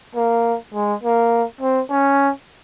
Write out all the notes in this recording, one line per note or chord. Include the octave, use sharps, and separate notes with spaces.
A#3
G#3
A#3
C4
C#4